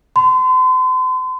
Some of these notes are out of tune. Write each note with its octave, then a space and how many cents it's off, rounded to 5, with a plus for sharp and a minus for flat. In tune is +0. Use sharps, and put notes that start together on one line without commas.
C6 -40